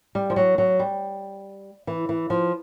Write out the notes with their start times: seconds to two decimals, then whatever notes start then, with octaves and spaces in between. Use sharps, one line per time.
0.15 G3
0.30 F3
0.36 F#3
0.58 F#3
0.79 G3
1.87 E3
2.09 E3
2.30 F3